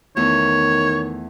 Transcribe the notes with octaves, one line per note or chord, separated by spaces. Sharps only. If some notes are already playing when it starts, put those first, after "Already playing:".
E2 D#3 A3 E4 C#5